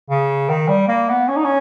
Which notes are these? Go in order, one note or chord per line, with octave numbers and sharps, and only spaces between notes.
C#3
D#3
G3
A#3
B3
C#4
D#4
C#4